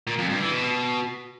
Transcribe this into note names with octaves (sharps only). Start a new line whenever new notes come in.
A#2
F2
G2
E3
B2